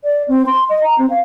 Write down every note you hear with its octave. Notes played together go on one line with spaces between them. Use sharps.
D5
C4
C6
D#5
A#5
C4
F5